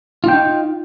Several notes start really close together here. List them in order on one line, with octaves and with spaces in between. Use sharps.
F4 G5 D#4